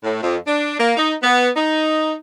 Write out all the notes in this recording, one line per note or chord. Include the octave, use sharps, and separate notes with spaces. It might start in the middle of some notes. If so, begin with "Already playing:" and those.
A2
F2
D4
A#3
D#4
B3
D#4